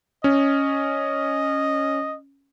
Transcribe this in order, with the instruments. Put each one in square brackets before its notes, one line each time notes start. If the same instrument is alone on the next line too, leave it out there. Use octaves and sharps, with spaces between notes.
[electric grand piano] C#4 [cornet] D#5